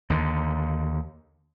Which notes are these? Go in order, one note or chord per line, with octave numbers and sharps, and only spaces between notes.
D#2 D3